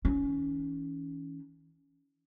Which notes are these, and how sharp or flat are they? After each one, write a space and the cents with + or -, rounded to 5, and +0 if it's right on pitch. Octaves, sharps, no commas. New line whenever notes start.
E3 -45 C#4 +10